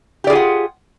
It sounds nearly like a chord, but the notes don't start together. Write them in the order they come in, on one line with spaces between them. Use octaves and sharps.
G4 D5 G#4 F4 F#5